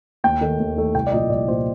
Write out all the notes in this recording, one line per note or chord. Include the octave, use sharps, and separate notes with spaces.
D#2 G5
D#3 A3
D#2
D#3 A3
C2 G5
D5
A#2 F3 D#5
C2 D5
A#2 F3 C5